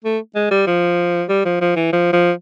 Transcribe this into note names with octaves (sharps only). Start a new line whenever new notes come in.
A3
G#3
G3
F3
G3
F3
F3
E3
F3
F3